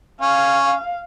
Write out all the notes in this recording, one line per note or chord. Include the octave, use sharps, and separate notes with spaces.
C#4 F5